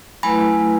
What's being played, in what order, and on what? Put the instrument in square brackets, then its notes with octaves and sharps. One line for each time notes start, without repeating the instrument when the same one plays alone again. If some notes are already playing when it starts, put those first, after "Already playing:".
[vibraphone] F#3 A3 E4 B4 [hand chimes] G#5 B5